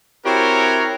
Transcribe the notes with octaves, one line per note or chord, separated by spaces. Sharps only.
C4 E4 F#4 G4 A#4 C#5